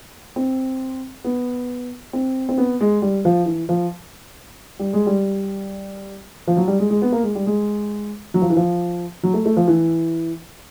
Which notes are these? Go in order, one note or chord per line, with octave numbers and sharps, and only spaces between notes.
C4
B3
C4
C4
B3
G#3
G3
F3
E3
F3
G3
G#3
G3
F3
F#3
G3
G#3
G#3
B3
A#3
G#3
G3
G#3
F#3
F3
E3
F3
F#3
A3
A3
F3
E3